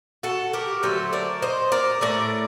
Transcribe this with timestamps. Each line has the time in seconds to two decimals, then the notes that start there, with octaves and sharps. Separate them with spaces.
0.23 F#4 A4
0.53 G4 A#4
0.83 D3 F#3 A3 A4 C5
1.13 A#4 D5
1.42 C5 D#5
1.72 A#4 D5
2.01 A2 A3 A#4 D5